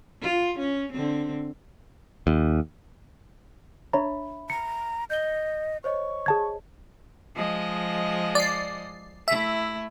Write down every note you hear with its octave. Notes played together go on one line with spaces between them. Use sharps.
F4
C#4
D3 C4
D#2
D4 C#5 E5 A#5 B5
A#5 C#7
D#5 G6 G7
C5 C#5 D#5 C#6
G#4 A5 G#6
F3 G#3 D#5
D5 C7
A3 E4 E5